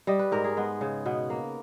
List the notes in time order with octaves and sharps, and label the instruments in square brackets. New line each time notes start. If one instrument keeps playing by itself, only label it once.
[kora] G3 D#5
B4
G#2 A#4
G#4
G#3 B3
C#3
B2 B3
A#3